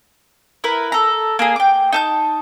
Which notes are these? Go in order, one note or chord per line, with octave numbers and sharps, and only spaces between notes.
E4 A#4 B4
A4 A#5
A#3 G#4
G5 D6
D#4 A5 G6